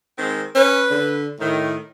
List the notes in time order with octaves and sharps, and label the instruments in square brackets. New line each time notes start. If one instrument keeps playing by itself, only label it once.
[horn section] D#3 G#3 C4
[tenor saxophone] C#4 [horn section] B4
[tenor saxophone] D3
[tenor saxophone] A2 [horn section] D#3